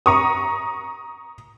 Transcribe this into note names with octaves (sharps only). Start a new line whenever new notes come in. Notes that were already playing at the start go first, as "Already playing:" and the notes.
A#5 C#6 D#6